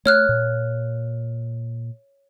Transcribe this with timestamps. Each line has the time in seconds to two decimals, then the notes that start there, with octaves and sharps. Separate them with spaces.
0.06 A3 C#5 F6 F#6
0.29 A#2